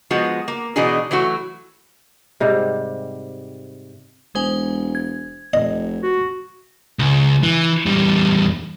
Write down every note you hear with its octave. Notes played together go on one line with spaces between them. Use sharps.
F3 G#3 B3 F#4
A#3
B2 E3 D4 D#4 F#4 G#4
E3 F#3 A3 F#4
G#2 C3 G3
E1 G#3 C5 G#5
G#6
F1 D#5
F#4
C#2
E3
E2 G3